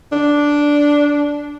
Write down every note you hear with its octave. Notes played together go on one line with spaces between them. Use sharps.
D4